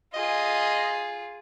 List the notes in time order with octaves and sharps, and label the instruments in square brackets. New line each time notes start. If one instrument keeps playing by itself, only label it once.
[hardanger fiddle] F4 G#4 [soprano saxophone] D#5